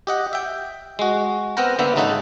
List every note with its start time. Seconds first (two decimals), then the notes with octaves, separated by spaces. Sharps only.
0.07 G4 D#5 F#5
0.33 E5 G5
0.99 G#3 F#4
1.57 B3 C4 A#4 F#5 G5 A#5
1.79 D3 A#3 B3 B4 E5
1.96 G#1 C#3 D#4 A4 E5 F#5